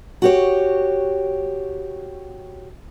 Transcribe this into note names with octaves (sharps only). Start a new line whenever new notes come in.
F#4 G4 C#5